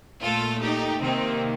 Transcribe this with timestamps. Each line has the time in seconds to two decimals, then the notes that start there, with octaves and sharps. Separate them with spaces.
0.21 A#2 A3 F4 A4
0.61 D#4 G4
1.01 C3 D#3 A#3 C4 D#4